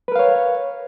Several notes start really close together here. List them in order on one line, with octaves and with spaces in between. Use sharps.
B4 A#4 F5 C#5